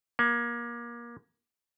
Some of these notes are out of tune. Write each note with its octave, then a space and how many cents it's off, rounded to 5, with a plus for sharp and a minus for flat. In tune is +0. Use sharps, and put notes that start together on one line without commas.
A#3 +25